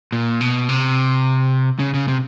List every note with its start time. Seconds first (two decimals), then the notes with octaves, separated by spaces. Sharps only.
0.12 A#2
0.41 B2
0.69 C3
1.79 C#3
1.94 C#3
2.08 C3